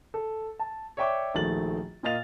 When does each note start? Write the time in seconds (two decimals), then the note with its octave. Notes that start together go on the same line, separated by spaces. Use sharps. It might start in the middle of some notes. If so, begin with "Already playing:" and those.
0.14 A4
0.59 A5
0.97 C#5 D5 E5 G5 C#6 D6
1.34 A#1 D#3 A3 F#4 A6 F#7
2.03 A#2 A#3 D#5 F5 A6 F7